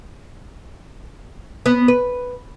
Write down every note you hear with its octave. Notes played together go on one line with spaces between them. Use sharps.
B3
B4